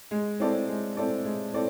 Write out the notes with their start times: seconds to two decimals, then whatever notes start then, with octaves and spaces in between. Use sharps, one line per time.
0.11 G#3
0.40 C4 E4 A4 D5
0.69 G#3
0.97 C4 E4 A4 D5
1.25 G#3
1.54 C4 E4 A4 D5